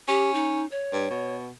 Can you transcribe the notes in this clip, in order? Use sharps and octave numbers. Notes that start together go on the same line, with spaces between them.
C#4 G4
D#4
C#5
G2
B2